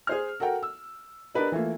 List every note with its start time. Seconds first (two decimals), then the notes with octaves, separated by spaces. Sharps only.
0.07 G#4 C5 F6
0.40 F#4 A4 A#4 F#5 G5
0.63 E6
1.34 D4 G4 A#4 B4 D#5
1.52 E3 A3 A#3 F4